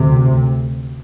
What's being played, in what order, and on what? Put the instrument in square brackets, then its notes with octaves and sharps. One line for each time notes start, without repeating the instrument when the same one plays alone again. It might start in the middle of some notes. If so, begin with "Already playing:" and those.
Already playing: [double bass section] D2 C3